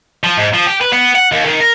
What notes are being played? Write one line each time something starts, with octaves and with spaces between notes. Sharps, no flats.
F3
G#2
F3
G4
B4
B3
F#5
D#2
D#3
A#4